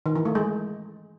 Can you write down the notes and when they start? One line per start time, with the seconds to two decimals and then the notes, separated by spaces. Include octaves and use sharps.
0.06 D#3
0.15 E3
0.25 A3
0.35 G#3